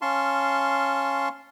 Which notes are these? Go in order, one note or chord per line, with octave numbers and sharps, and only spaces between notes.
C#4 F5 A5 C6 C#6